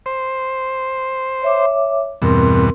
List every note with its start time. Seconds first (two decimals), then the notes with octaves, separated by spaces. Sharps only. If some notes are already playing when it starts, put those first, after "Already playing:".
0.06 C5
1.42 C#5 E5 D6
2.22 E2 G2 B2 C4 A#4 C6